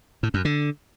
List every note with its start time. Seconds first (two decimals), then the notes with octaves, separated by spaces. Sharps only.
0.23 A2
0.34 F#2
0.45 D3